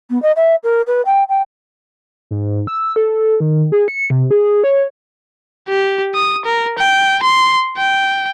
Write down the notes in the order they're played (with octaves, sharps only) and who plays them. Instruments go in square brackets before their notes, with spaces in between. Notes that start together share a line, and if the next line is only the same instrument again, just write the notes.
[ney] B3
D#5
E5
A#4
B4
G5
G5
[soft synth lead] G#2
E6
A4
D#3
G#4
C#7
C3
G#4
C#5
[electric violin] G4
D#6
A#4
G5
C6
G5